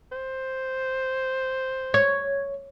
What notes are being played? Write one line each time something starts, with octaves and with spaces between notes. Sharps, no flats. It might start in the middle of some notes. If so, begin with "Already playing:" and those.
C5
C#5 G#6